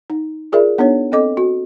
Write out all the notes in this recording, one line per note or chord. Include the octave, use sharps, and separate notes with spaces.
D#4
F4 G#4 A#4 D5 E5
B3 D4 D#4 C#5
C4 A4 D#5 D6
F#4